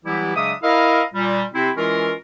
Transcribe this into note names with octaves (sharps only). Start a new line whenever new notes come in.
E3 F#3 G3 B3 E4 G4
C#3 F#3 G#3 D4 E5 D#6
E4 A#4 D#5 F5
A#2 G3
C3 C4 E4
E3 G#3 C#4 E4 F4 A#4